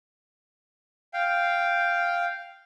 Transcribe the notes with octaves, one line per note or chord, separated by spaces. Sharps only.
F5 G5